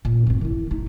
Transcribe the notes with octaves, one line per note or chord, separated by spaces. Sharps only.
A#2
G1 C4
D#3 E4
D#4 E4